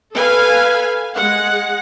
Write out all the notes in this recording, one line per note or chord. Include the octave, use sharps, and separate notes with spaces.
A4 B4 F5 G#5
G#3 F#5